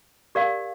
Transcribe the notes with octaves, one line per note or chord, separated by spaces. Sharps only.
G4 A#4 D5 F5